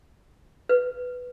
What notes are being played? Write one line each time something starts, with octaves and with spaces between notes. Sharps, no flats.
B4